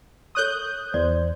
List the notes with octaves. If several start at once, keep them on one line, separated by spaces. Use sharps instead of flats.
A4 C#5 C#6 D#6 F#6 G6
E2 C5 D5